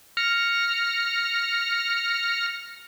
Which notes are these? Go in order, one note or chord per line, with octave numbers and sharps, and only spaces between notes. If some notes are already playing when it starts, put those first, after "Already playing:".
F6 A#6 C#7